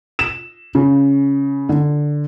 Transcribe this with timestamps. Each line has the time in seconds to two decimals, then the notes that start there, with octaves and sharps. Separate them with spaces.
0.19 E7
0.75 C#3
1.69 D3